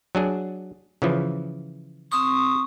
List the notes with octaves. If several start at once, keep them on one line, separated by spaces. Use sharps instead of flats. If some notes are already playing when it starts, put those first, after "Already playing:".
F#3 D4 G#4
C#3 E3 F3
C4 C6 C#6 D#6